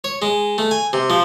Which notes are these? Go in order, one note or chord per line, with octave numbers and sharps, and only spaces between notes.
C#5
G#3
A3
G#5
C3
F3